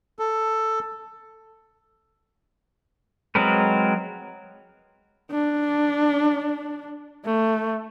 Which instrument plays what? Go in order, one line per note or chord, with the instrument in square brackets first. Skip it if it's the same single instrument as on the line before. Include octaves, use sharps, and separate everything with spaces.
[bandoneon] A4
[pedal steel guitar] F#3 G#3 C4 A#4 B4
[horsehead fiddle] D4
A3